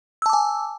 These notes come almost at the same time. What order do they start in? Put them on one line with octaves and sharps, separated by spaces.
E6 A5 D6 G#5